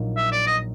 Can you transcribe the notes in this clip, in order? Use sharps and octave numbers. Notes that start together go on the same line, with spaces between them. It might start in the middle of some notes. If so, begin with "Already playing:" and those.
Already playing: A#1 A#2 F#3 A#3 D#4
E5
D5
D#5